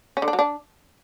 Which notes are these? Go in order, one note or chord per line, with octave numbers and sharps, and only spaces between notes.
C#4
D3
D4
F#3
D4